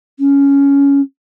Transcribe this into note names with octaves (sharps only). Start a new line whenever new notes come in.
C#4